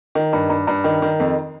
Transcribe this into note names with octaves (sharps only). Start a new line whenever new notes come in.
D#3
G2
G2
G2
D#3
D#3
F2